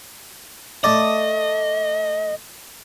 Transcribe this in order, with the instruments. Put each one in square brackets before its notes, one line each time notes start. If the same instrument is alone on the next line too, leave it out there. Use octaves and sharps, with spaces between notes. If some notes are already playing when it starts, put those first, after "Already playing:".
[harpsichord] A3 D5 [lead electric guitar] D#5